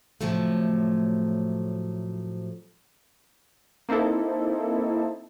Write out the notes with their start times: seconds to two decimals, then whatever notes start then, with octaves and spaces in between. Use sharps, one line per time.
0.21 A2 C3 F3 F#3 A3
3.89 A#3 C4 D#4 E4 A4